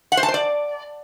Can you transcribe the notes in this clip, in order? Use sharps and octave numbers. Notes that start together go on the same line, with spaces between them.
F#5
C5
A5
C5
D5